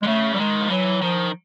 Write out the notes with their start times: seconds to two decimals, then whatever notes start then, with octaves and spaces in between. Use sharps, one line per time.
0.02 D3 G#3
0.07 C#3 A3
0.32 E3 G3
0.39 D#3 G#3
0.61 F3
0.70 E3 F#3
1.02 D#3 F3